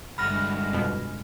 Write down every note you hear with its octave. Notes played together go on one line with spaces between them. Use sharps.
G1 C2 G#3 F#4 B5 F6 A#6
F2 B2